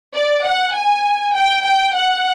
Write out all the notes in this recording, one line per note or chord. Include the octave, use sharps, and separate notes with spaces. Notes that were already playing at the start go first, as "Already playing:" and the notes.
D5
F#5
G#5
G5
G5
F#5